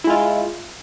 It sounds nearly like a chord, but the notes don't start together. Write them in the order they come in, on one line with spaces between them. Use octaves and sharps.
E4 G#3 F4